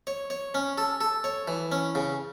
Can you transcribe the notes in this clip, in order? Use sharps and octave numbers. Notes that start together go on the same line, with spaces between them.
C#5
C#5
C#4
A4
A4
C#5
E3
C#4
C#3